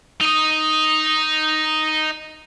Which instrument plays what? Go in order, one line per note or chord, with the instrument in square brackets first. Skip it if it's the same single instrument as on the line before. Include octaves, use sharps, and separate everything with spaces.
[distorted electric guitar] D#4 D#5